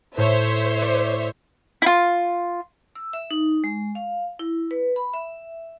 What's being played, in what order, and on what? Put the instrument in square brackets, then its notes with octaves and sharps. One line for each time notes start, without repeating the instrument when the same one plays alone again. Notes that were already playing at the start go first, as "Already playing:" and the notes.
[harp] A2 [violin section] C5 C#5 E5
[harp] D5
[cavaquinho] E4 F4
[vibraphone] E6
E5
D#4
G#3
F5
E4
B4
B5
E5